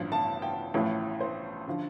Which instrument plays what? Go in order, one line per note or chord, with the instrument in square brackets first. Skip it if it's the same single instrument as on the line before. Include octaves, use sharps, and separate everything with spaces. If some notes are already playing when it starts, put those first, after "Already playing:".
Already playing: [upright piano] A1 G2 F3
A5
G5
A1 A2 F3
C5
D3 F3